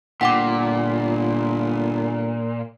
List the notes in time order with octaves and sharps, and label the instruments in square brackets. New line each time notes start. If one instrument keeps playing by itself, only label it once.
[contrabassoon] G1 [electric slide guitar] A#2 [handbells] F#5 G5 D6